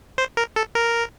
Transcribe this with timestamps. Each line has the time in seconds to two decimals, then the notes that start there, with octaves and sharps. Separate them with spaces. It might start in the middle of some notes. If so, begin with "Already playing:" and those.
0.18 C5
0.37 A#4
0.56 A4
0.75 A#4